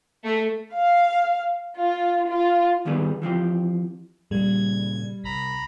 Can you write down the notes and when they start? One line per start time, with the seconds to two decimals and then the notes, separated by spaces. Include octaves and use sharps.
0.24 A3
0.74 F5
1.77 F4
2.29 F4
2.85 D#2 D#3 G3 B3 G#4 B4
3.22 E3 F3 C4 G4
4.31 A#2 C#3 G3 G#6
5.24 C2 A#5 B5